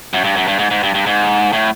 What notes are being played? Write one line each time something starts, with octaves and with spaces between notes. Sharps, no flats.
F#2
G2
F#2
G2
G#2
G#2
G2
G2
G#2
A2